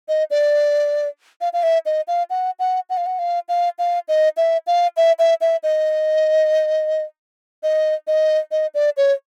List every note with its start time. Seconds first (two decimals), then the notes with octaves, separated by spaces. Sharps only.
0.08 D#5
0.30 D5
1.41 F5
1.53 F5
1.63 E5
1.86 D#5
2.08 F5
2.30 F#5
2.59 F#5
2.90 F#5
2.97 F5
3.06 F#5
3.19 F5
3.49 F5
3.79 F5
4.08 D#5
4.37 E5
4.67 F5
4.97 E5
5.19 E5
5.41 E5
5.63 D#5
7.63 D#5
8.07 D#5
8.51 D#5
8.74 D5
8.97 C#5